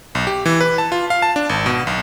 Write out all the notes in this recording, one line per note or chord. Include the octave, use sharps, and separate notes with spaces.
B1
G4
E3
B4
A5
F4
F5
A5
D4
G#1
B2
B1